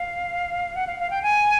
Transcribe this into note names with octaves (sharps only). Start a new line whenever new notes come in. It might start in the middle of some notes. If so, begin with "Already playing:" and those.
Already playing: F5
F#5
F5
F5
G5
G#5